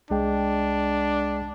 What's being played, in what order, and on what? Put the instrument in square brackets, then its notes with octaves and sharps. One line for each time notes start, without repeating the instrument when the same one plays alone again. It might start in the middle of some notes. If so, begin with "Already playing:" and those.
[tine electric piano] C2 G#3 G5 [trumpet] D4